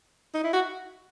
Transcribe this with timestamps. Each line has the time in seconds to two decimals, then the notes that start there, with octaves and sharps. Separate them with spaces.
0.34 D#4
0.44 E4
0.53 F#4